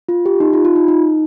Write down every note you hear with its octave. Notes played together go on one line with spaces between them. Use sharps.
F4
G4
D#4
F4
F4
D#4
D#4